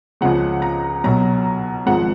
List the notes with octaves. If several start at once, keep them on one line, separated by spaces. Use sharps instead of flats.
C#2 C#3 F3 G#3 F#5
A#5
B1 B2 F#3 A#5
G#1 G#2 F3 G#3 F#5